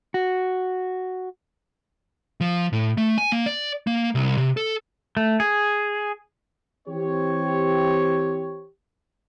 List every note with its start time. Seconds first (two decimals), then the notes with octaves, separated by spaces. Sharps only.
0.14 F#4
2.41 F3
2.73 A2
2.97 A3
3.18 G#5
3.32 A#3
3.46 D5
3.87 A#3
4.15 C2
4.37 C3
4.57 A4
5.17 A3
5.40 G#4
6.88 E3 C4 G4 C#5